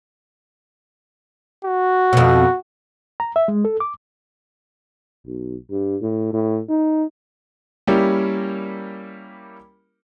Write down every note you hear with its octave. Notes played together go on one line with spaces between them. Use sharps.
F#4
F2 B2
A#5
E5
G#3
A4
D6
B1
G2
A2
A2
D#4
G3 A#3 C#4 E4 G4 A#4